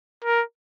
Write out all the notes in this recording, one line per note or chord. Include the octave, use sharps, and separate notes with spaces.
A#4